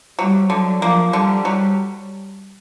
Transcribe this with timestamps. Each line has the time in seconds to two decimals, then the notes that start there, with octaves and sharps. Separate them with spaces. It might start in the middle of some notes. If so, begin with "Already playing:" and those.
0.19 F#3 G3
0.50 D3 F#3
0.82 F3 A#3
1.13 D3 G3
1.45 F#3